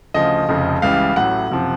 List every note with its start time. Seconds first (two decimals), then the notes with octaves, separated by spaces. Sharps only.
0.14 D2 C#3 F3 D#5
0.49 F1 F2 C#3 F3
0.82 C#2 C#3 E3 G3 F5
1.16 A1 A2 F#3 F#5
1.50 F#1 C3 F3